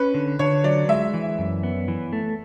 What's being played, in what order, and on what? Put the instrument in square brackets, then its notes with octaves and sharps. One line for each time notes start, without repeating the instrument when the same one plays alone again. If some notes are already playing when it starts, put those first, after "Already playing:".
Already playing: [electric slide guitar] C#4 [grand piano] B4
[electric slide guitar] D3
[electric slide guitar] D3 [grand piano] C#5
[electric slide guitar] F#3 [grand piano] D5
[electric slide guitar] G#3 [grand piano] E5
[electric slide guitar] E3
F#2
B3
E3
A3